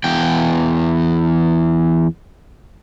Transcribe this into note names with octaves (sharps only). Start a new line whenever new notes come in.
E2 G5